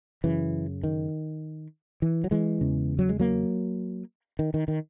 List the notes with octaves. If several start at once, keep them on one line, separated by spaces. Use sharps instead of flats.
F#2 C#3 E3
D#3
E3
F#3
E3 G#3
E2 C#3
F#3
G#3
F#3 A#3
D#3
D#3
D#3